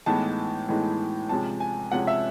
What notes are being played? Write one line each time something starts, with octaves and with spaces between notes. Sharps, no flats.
A2 E3 G#3 B3 D#4 A5
A2 E3 G#3 B3 D#4
C3 F3 G#3 C#4 A5
G#5
C3 F3 G#3 C#4 F#5
E5